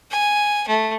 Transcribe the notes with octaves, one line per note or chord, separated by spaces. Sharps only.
G#5
A3